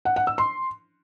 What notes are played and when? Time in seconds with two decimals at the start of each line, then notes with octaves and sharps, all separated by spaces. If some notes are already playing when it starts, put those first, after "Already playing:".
0.05 F#5
0.16 F#5
0.27 E6
0.38 C6